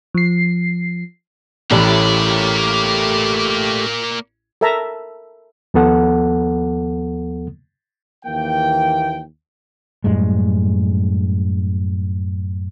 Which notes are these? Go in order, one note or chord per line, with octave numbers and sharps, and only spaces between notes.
F3 C7
A1 A2 A3 A#3 G4 D5
A4 A#4 E5 A5 A#5
D#2 F3 B3 A4 F#5
D#2 E3 A#3 G5
F#2 A2 G3 G#3